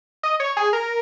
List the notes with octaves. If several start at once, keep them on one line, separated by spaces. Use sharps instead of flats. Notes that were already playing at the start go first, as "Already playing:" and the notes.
D#5
C#5
G#4
A#4